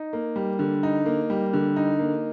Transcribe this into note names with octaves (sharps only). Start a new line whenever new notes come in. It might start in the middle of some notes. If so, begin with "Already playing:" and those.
Already playing: D#4
A#3
G3
D3
D#4
A#3
G3
D3
D#4
A#3